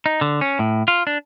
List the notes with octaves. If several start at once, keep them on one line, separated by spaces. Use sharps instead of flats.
D#4
D3
C#4
A2
F4
D4